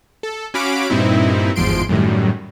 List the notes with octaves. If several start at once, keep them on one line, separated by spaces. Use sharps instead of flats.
A4
C#4 F#4 F5 B5 D6 D7
G2 A#2 C4 D#4 E4
G1 E2 G#2 F3 C6 D7
F#2 A2 D#3 G3